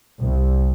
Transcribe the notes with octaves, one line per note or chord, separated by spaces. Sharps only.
C2